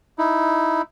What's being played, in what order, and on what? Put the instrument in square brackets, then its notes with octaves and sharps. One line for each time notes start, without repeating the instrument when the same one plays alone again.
[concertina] D#4 E4